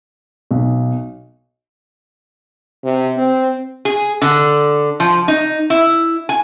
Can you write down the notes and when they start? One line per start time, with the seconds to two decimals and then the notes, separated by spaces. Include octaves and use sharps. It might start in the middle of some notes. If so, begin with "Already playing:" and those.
0.51 B1
2.84 C3
3.17 C4
3.85 G#4
4.22 D3
5.00 F3
5.28 D#4
5.70 E4
6.29 G#5